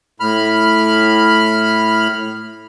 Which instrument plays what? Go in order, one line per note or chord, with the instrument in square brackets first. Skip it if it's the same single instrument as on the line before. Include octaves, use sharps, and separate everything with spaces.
[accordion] A2 B5 F6